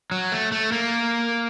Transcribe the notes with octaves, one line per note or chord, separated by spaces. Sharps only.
F#3
A3
A3
A#3